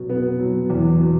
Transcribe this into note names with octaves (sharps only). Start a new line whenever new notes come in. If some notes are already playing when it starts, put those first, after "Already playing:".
Already playing: B2 F#3
B3
F#3
E2
B2